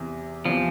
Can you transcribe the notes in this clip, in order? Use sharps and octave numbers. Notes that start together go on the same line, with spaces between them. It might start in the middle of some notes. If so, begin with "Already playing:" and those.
Already playing: E2 C3 E3
E2 C3 E3 F3